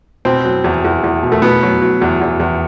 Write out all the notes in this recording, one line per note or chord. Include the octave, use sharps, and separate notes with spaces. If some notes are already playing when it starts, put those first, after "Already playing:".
B2 C4
F#3
E2
E2
E2
B2
A3
B2 B3
F#3
F#3
E2
E2
E2